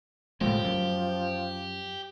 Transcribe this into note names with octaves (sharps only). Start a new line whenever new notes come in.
A2 D3 F3 G#3 G4
F#2